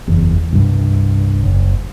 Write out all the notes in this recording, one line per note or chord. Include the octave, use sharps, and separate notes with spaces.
F#1 E2
C2 G2
F#1